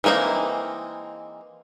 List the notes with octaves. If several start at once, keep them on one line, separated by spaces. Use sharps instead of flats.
E3 G#3 A#3 C4 D#4